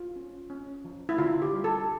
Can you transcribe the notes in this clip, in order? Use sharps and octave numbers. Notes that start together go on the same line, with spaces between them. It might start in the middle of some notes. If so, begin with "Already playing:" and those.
Already playing: F4
C#4
C#4
F3
E4
D3 F4
G4
G3
A4